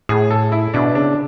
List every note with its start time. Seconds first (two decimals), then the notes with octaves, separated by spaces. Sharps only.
0.09 A2 G#4
0.30 A4
0.52 E4
0.74 B2 D4
0.95 C#3 D4